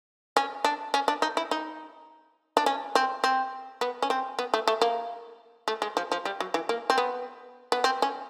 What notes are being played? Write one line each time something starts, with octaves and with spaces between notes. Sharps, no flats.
C#4
D4
C#4
D4
D#4
E4
D#4
D4
C#4
C4
C4
B3
C#4
C4
B3
A3
A3
A#3
A3
G#3
F3
F3
G3
F#3
E3
A#3
C4
B3
B3
C4
C#4